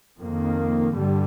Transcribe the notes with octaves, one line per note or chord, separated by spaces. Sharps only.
F2 D#3 A#3
G2 D3 G3